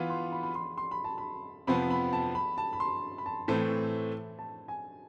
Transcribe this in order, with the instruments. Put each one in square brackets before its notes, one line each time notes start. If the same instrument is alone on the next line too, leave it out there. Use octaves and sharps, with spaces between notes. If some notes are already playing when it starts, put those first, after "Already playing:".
Already playing: [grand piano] E3 B3 F4
[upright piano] C6
B5
B5
C6
C6
B5
A5
B5
[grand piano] F2 C3 F3 B3 [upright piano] B5
[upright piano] B5
A5
B5
A5
B5
C6
B5
A5
[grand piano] A2 E3 A3 C4
[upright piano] A5
G#5